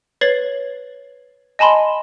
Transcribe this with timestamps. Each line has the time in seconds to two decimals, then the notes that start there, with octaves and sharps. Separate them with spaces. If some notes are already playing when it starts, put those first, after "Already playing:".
0.21 B4 C#5 A6 C7 F#7
1.59 D#5 G#5 A5 B5 C6